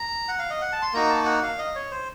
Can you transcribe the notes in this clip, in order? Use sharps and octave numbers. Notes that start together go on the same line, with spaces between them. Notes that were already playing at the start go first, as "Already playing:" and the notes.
Already playing: A#5
F#5
F5
D#5
F#5
A5
C6
A#3 D#4 F#4 A#5
A5
F#5
F5
D#5
C#5
C5